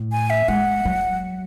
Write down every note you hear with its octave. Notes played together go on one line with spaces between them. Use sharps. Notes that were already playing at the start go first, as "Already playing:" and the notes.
Already playing: A2
G#5
E5
G#3 F#5
F#3